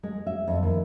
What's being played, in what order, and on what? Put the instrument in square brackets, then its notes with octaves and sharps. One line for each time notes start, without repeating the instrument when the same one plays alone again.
[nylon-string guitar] G#3
E5
F2
D#2